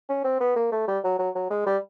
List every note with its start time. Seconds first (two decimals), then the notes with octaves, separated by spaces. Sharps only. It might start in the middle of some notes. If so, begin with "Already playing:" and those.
0.09 C#4
0.24 C4
0.40 B3
0.56 A#3
0.72 A3
0.88 G3
1.04 F#3
1.19 F#3
1.35 F#3
1.51 G#3
1.66 G3